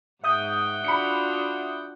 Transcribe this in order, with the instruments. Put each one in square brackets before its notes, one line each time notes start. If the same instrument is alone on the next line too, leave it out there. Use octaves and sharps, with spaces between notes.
[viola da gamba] G#2 [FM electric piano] E5 D#6 G6 [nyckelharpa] F#5 G5
[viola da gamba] D4 F4 F#4 [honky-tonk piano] B5 C#7